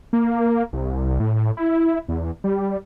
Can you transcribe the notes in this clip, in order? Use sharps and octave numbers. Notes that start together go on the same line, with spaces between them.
A#3
C2
A2
E4
E2
G3